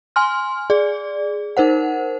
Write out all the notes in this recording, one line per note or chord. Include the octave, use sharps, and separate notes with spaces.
G#5 C6 F6
G#4 D5
D#4 A#4 C5 F#5